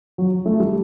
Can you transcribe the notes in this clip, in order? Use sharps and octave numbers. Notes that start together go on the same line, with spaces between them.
F#3
A3
G3